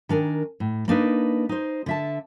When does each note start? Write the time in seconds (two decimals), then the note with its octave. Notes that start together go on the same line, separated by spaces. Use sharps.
0.09 D#3 D4 A#4 G#5
0.60 A2
0.88 A#3 D4 D#4 B4
1.49 D#4 C5
1.86 D3 E5 A5